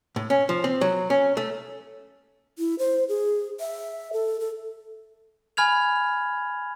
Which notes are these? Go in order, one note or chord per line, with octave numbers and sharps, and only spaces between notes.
A2
C#4
F3
C4
F#3
C#4
A3
E4
C5
G#4
E5
A4
A4
G#5 B5 F6 G#6 F7